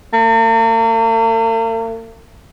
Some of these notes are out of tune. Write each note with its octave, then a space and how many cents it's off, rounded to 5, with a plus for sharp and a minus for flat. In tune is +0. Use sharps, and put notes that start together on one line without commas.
A#3 -45